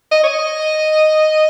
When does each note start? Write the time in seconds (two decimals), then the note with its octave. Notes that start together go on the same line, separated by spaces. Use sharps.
0.11 D#5
0.23 C#5
0.28 D#5